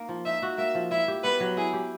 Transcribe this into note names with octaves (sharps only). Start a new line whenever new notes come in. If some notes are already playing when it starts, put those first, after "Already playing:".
Already playing: A#3 D#4
F3
D#4 E5
F#4
A#3 E5
F3
E4 E5
G4
B3 B4
F#3
E4 G#4
G4